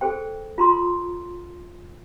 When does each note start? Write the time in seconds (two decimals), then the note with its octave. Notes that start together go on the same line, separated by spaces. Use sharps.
0.01 G#4 A4 C5 G5
0.58 F4 A#5 C6 D#6